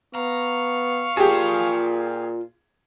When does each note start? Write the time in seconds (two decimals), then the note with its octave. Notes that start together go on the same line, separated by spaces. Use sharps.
0.15 B3 F5 A#5 C#6
1.17 A#2 F4 G4 G#4 A5